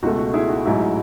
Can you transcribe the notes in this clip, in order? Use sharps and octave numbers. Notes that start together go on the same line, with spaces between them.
C#2 B2 A3 F#4
F#4
E4 G#4
F#4
A1 G#2 F#3 E4